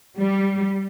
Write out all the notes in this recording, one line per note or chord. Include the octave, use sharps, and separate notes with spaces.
G3